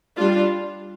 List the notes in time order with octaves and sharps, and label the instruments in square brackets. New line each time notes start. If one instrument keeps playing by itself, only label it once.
[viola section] G3 D4 F4